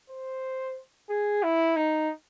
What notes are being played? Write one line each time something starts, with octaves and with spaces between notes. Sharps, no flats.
C5
G#4
E4
D#4